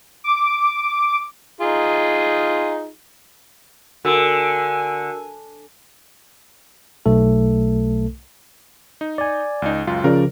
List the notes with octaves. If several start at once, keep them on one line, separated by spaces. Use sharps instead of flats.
D6
D#4 F4 G#4
D3 F#4 A#4 G#5 E6
B1 A3 A4
D#4
D5 G#5
C#2 D#4
C#2 F#2 F4
C#3 F3 A#4 C5 D5